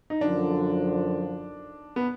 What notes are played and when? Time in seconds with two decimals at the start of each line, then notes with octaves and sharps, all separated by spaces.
0.10 D#4
0.21 F#2 D3 F3 D4
1.96 B3